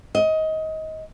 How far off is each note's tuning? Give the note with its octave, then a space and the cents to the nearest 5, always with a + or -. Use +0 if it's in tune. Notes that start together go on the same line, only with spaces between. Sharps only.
D#5 +20